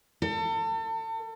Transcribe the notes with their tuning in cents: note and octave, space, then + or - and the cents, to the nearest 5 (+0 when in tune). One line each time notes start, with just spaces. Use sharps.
A4 +35